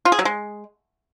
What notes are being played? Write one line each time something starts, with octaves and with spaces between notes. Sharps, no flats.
F4
G#4
F#3
G#3